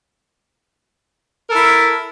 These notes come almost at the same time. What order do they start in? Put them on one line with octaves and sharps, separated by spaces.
A#4 A4 E4